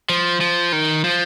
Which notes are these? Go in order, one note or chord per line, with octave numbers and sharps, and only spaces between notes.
F3
F3
D#3
F3